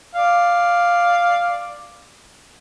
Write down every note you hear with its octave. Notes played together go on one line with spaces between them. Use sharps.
D5 F5